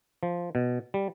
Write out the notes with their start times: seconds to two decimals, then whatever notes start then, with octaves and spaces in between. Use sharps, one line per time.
0.23 F3
0.55 B2
0.94 G3